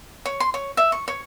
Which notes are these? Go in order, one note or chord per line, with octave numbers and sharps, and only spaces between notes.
C#5
C6
C#5
E5
C#6
C#5